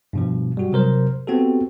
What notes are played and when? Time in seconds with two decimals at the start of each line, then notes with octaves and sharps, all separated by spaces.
0.13 G2 B2 F3
0.57 G3 F#4
0.72 C3 F#3 A#4 C5
1.27 B3 C4 F#4 G4 A4